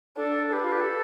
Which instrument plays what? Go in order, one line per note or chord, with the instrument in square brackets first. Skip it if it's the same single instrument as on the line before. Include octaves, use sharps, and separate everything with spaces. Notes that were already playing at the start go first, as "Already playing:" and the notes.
[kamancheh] D4 [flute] A4
[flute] A4
[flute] G4 [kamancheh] B4
[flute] F4
G4
A4